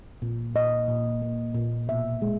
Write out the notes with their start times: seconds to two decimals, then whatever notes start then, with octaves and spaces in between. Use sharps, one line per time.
0.22 A#2
0.55 A#2 D#5
0.88 A#2
1.22 A#3
1.54 A#2
1.88 B2 E5
2.22 G#3